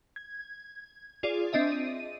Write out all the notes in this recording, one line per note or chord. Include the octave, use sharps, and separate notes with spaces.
G#6
F4 G#4 D5
C4 D4 D#5 E5
D#7